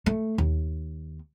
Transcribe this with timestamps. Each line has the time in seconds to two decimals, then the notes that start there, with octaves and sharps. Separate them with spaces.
0.06 A3
0.38 D#2